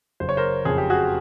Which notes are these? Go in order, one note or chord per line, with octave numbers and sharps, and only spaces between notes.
F#1 C5
C#5
A#4 C5
F2 C#3 G#4
G4
F#4 G#4